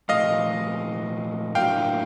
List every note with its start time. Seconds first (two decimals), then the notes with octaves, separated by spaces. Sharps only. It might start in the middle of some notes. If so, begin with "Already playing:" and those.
0.09 A#2 F3 A3 D#5 F5
1.55 A2 F#3 A#3 D4 F#4 F5 G5